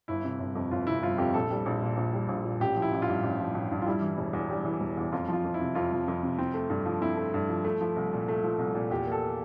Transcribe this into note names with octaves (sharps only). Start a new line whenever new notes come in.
G1 E4
C3
G1
F2
G1 F4
C3 E4
G1 F4
F2 G4
A#1 A4
G3
A#1
A#2
A#1
G3
A#1
A#2
A1 G4
F3
E4
A1
F4
G2
A1
F3
A1
G2
F4
G3 E4
E3
E1
E2
G3
E3
E1
E2
F2 F4
F3 F4
F2
E4
C3
F2 F4
F3
F2
C3
C4
A3
G2
F3
C4 E4
A3
G2
F3
A3
F3
C2
A#2
A3
F3
C2
A#2
E2 G4
A#3 A4